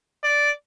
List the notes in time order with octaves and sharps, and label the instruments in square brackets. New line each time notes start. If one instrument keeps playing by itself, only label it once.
[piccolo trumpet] D5